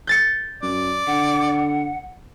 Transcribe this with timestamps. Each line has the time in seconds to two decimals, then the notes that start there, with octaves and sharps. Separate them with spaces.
0.07 G6 A6 C#7
0.63 F#2 D5
1.07 D3 F#5